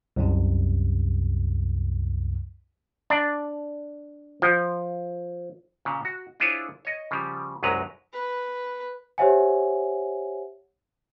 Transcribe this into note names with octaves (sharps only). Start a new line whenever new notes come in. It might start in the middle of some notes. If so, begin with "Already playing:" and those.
C2 F#2 C3
D4
F3
A#2 C#3
F#4
D4 E4 F4 G#4 C5 C#5
C#5 D#5
C#3 F3 G3
C2 F#2 F#3 G#3 B4 A#5
B4
G4 C5 C#5 E5 F#5 G#5